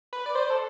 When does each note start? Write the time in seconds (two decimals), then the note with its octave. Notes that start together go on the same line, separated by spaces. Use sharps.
0.13 B4
0.26 D5
0.35 C5
0.50 A4